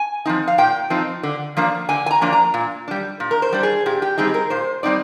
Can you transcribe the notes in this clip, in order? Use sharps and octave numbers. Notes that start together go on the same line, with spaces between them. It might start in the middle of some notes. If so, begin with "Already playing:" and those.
Already playing: G#5
F3 C4 D#4
F5
A#2 G5
F3 C4 D#4
D3
F3 A#3 D4
D3 G#5
G#5
A#5
F3 A#3 D4
A#5
A#2
G3 D4
A#2
A#4
C5
G3 D4
G#4
A#2 G4
G4
G3 C4 D#4 G#4
A#4
A#2 C5
G3 C4 D#4 D5